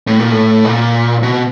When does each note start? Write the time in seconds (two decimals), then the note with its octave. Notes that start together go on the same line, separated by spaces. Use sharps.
0.07 A2
0.19 A#2
0.31 A2
0.65 A#2
1.23 B2